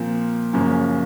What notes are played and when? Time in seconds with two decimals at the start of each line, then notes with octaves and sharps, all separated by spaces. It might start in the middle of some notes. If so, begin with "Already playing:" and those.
Already playing: A#2 F3 C4 F4 A#4
0.53 F#1 F#2 F3 A#3 C#4